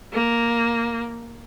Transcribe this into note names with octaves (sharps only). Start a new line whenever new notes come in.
A#3